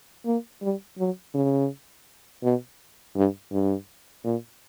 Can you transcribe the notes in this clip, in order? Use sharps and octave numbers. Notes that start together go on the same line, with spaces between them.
A#3
G3
F#3
C#3
B2
G2
G2
A#2